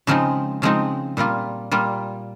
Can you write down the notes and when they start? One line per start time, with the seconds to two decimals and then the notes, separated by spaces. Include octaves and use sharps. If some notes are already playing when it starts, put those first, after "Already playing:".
0.07 C#3 F3 G#3 C4 D#4
0.62 C#3 F3 G#3 C4 D#4
1.17 A#2 G3 A#3 F4
1.71 A#2 G3 A#3 F4